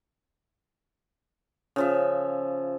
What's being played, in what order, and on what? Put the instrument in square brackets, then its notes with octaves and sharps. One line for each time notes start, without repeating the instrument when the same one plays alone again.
[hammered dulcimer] C#3 F3 E5